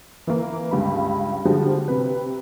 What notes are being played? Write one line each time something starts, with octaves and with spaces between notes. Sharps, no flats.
E3 A#3
C#2 G2 B5
D3 F3 G3 G#3 F#4
C3 B4